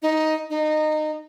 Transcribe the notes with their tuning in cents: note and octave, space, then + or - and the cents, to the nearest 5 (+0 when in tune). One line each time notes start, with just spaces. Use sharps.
D#4 +10
D#4 -20